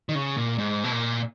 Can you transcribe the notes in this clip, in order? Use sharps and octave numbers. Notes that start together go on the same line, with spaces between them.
D#3
C#3
A#2
G#2
B2
A#2